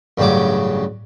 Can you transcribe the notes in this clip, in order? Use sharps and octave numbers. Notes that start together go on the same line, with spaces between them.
A1 G2 C#3 F#3 D6